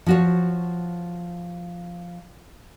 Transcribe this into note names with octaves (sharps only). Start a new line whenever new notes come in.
F3 F#4 C#5